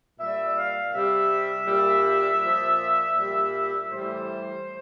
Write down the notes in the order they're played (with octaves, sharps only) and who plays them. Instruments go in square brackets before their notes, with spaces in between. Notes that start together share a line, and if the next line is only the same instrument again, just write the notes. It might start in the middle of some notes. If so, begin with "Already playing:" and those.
[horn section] A#2 G3 E5
F5
C3 G3 E5
A#2 G3
A#2 F3
A#2 G3
A2 E3 G3 C5